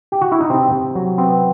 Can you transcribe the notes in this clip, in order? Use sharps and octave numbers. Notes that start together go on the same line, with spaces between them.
G4
F#4
E4
D#4
C3 C4
C3
F#3
B3 C4